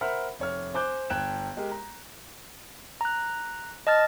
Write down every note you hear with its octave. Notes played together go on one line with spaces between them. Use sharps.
A#4 C5 E5 F#5 B5 F6
F1 C#5 F6
C5 G#5 D6 F#6 G6
G1 G5 F#6 G#6 E7
G#3 G4 A#4
A#5
A#5 F#6
D#5 A5 F6 A6